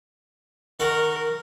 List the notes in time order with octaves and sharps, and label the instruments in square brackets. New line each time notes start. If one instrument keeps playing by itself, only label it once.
[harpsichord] D#3 F#5 C#6 [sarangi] A#4